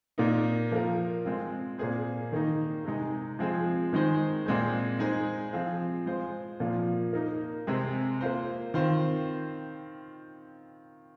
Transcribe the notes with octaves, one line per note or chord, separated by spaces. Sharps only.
A#2 A#3 D#4
F3 A#3 F4 A#4
G#3 C4 F4
A#2 A#3 G#4 C5
D#3 A#3 D#4
C3 G#3 D#4
F3 G#3 C4 G#4
D#3 G#3 D#4 C5
A#2 G#3 C4 G#4 C5
G#3 D#4 G#4 C5
F3 C4 F4 G#4
G#3 F4 C5
A#2 F3 A#3 F4
A#3 D#4 A#4
C3 G#3 C4 G#4
A#3 F4 C5
D#3 C4 F4 C5